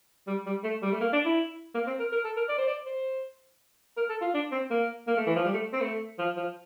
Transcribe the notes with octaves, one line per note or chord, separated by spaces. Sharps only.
G3
G3
A3
G3
A3
A#3
D4
E4
A#3
C4
A#4
A#4
A4
A#4
D5
C5
D5
C5
A#4
A4
F4
D4
C4
A#3
A#3
A3
E3
F3
G3
A3
C4
A3
F3
F3